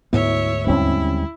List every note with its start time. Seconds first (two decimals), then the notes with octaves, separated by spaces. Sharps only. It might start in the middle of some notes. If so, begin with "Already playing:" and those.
0.13 D2 G#2 B3 E4 C#5 E5
0.67 D#2 D3 G3 G#3 C4 C#4 E4